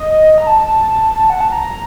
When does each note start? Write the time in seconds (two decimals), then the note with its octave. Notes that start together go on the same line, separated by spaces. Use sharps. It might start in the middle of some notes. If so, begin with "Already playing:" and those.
Already playing: D#5
0.38 A#5
0.47 A5
1.30 F#5
1.41 A5
1.52 A#5